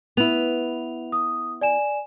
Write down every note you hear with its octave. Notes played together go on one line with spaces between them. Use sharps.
B3 E4 F7
D#6
D5 G#5 E7